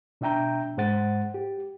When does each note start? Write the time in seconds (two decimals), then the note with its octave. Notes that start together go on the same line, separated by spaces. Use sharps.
0.21 B2 D4 E5 G5 A#5 G6
0.77 G#2 G#3 C5 F#5 A6
1.34 G4